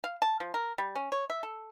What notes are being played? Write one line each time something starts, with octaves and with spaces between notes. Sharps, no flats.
F5
A5
F3
A#4
G3
C#4
C#5
E5
A4